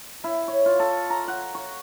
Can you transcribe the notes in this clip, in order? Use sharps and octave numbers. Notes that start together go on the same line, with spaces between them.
E4
C#5
F4
A4
A#5
F#5
C#6